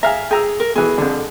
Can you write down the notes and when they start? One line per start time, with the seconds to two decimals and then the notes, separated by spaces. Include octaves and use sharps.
0.03 G#4 E5 F5 A#5
0.31 G#4 G5 A#5 E6
0.60 A#4
0.76 B2 E3 G#4
0.98 F2 D3